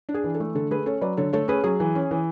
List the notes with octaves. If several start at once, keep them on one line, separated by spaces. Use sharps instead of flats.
D4
G#4
E3
A4
A3
D3 A4
A3 G#4 B4
C#4 A4 C#5
F#3 B4 D5
D3 A4 C#5
A3 A4 C#5
C#4 G#4 B4
F#3 G#4
E3
C#4
E3